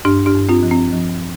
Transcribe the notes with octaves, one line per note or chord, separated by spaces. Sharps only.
G2 D4 G4
D4 G4
G2
C4 F4
F3
C4
F3